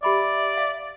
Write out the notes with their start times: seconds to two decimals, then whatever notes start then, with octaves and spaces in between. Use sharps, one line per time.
0.03 G4 D5 E5 B5 D6
0.57 F5